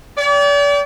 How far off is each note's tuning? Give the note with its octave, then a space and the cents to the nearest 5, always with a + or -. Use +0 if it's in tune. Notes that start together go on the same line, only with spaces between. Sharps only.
D5 -40 G5 +0